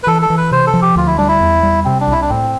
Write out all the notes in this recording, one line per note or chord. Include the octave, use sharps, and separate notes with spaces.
B4
E3 A4
A4
E3
B4
C3 C5
A4
F3
G4
D2 F4
E4
G3 D4
E4
E2
G3
C3 C4
D4
C2 E4
D4
A2 C4